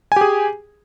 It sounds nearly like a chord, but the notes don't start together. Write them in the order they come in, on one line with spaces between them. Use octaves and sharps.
G#5 G4 G#4